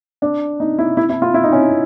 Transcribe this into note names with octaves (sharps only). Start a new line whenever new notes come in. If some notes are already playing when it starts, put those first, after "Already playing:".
D4
D#4
E4
E4
E4
F4
E4
D#4
C#4